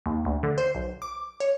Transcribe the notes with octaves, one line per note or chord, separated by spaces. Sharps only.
D#2
D2
D3
C5
B1
D6
C#5